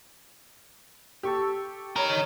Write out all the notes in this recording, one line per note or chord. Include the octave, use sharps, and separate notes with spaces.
G4 A4 C#6 E6
D#4 A#4 C#5 B5